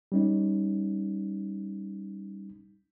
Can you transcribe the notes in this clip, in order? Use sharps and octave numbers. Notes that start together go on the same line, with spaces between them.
G3 C#4 D#4